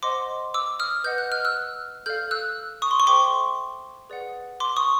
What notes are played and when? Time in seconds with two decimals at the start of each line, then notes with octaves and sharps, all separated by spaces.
0.03 C5 D#5 F#5 C6 D6
0.54 D6 E6
0.79 D#6 F6
1.04 B4 D#5 F#5 G6
1.18 F#6
1.32 F6
1.45 E6 F#6
2.06 A4 D5 F5 F6 G6
2.31 E6 F#6
2.82 C#6 D#6
2.91 C6
3.00 C#6
3.07 A4 C5 E5 G5 C6 D6
4.09 G#4 B4 D5 F#5
4.60 C6 D6
4.77 C#6 D#6